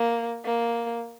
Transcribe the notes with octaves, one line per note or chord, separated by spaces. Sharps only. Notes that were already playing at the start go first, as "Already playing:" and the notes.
Already playing: A#3
A#3